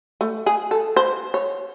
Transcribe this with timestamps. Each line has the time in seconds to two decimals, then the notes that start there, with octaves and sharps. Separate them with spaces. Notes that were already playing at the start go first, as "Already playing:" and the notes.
0.21 A3
0.46 G#4
0.71 A4
0.96 C5
1.34 C#5